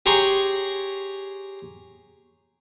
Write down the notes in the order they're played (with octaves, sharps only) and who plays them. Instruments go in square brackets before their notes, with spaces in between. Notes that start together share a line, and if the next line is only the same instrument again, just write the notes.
[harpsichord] G4 G#4 C#5 A#5 C6 C#6